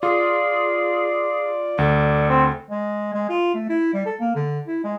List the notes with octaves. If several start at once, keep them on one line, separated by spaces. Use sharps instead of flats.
F4 G#4 D5
D2 A4
C4
G#3
G#3
F4
A3
E4
G3
A4
A#3
D3
E4
G#3